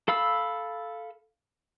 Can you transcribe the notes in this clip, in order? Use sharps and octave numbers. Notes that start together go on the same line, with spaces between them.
A4 F5 B5 E6